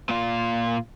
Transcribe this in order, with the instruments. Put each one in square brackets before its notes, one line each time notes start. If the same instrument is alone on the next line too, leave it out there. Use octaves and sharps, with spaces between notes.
[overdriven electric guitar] A#2 F4